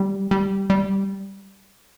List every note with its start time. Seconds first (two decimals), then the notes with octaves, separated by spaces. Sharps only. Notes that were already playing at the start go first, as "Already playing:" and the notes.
Already playing: G3
0.31 G3
0.70 G3